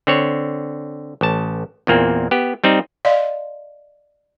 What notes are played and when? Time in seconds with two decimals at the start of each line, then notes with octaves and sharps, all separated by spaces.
0.07 D3 C4 C#5
1.21 A1 A5
1.87 E2 A#2 A#3 C4
2.31 B3 G4
2.64 G3 C4 D#4
3.05 D5 D#5 F5 C6